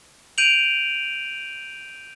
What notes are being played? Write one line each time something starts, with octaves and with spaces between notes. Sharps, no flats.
G6 D7 D#7 F7 F#7